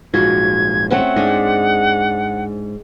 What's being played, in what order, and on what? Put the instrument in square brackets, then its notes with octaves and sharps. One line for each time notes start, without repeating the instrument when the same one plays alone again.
[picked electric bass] A#1 G#2 [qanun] F4 F#4 [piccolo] G#6
[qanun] A3 C4 C#4 [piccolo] F#5
[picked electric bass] G#2 [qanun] G#3 D4